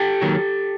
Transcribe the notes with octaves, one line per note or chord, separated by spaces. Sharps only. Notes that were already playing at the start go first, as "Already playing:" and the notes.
Already playing: G4 A4
D#2 D#3 F#3